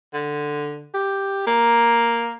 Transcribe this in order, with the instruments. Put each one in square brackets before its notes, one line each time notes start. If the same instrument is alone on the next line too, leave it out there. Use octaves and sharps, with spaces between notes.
[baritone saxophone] D3
G4
A#3